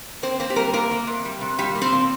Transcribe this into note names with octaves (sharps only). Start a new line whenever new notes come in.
A#3 C4 C5
A#3 C4 C5
G4
G3 A#3 A#4
C3 A#3 A#4
A#3
C3
G3
C3
A#2 G3 G4
A#3
C4 C5
A#2